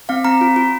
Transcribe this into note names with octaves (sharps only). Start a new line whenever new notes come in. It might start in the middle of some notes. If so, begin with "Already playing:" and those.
C4 F5
C4 A#5
F4
F4